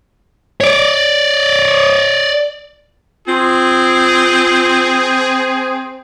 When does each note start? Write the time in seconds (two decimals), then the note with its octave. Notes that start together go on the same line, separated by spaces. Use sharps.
0.61 C#5 D5
3.28 C4 F4 G#4